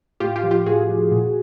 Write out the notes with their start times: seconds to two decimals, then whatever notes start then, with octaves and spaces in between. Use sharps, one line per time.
0.20 A2 F4 G4
0.36 F4 G4
0.43 F3
0.51 F4 G4
0.66 A2 F#4 G#4
0.89 F3
1.12 A#2